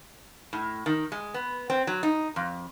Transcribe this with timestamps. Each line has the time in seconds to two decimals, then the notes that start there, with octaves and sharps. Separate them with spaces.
0.53 A2
0.86 D#3
1.12 G#3
1.34 B3
1.70 C4
1.87 F#3
2.03 D#4
2.36 F2